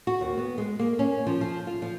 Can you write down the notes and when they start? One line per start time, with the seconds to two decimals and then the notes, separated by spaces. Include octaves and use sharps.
0.07 F#4
0.21 D#2
0.37 B3
0.58 G#3
0.79 A#3
0.99 C#4
1.27 F3
1.41 F3
1.67 F4
1.82 F3